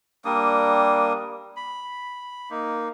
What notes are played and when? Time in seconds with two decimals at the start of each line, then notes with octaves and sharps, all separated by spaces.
0.25 G3 A#3 D4 D#6
1.56 B5
2.51 A#3 D#4